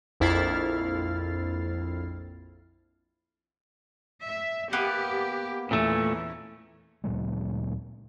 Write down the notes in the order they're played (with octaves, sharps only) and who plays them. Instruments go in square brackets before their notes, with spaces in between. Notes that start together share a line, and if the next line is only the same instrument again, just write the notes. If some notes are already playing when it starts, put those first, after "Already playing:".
[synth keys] A#1 F2 E4 F6 A6 C7
[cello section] E5
[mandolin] A#3 B3 B4 [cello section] G4
[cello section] E2 E3 C#4 [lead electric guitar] A#2 A3
[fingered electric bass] D2 A#2 F#3 G#3